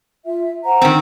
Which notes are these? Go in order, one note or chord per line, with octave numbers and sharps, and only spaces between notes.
F4 E5
C5 F#5 A#5
D#3 C4